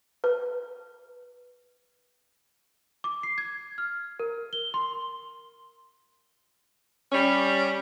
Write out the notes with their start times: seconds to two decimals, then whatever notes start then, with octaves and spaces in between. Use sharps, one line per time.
0.24 B4
3.04 D6
3.23 C7
3.38 G#6
3.78 F6
4.20 A#4
4.53 G7
4.74 C6
7.12 G3 C#4